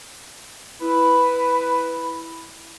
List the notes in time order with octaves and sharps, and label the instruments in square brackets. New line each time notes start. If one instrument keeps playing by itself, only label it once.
[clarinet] E4 [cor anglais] B4